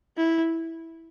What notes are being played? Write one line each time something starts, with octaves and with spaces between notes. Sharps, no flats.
E4